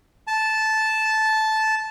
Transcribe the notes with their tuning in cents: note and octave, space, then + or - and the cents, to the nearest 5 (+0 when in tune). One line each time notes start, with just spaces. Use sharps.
A5 -10